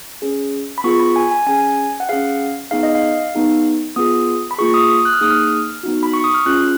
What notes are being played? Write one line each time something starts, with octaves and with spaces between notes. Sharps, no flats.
C#4 G#4
B5
B3 F4 G#4 C#6
B5
G#5
G#5
C#4 G#4 G#5
F#5
C#4 G#4 F5
B3 D#4 G#4 F5
D#5
F5
B3 D#4 G#4
B3 F4 G#4 D#6
B5
A#3 F4 G#4 C#6
D#6
D#6
F#6
F6
A#3 D#4 G#4 D#6
F6
B3 D#4 F#4
B5
C#6
D#6
F6
C#4 F4 G#4 F#6